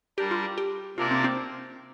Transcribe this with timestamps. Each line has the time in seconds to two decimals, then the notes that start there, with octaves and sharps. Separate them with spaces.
0.18 G3 D4 G4 A#4
0.31 F4
0.58 G4
0.97 C3 A#3 D4 F4 A#4 D5
1.11 C4
1.24 C4